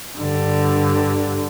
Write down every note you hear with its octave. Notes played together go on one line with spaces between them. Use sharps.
G2 D3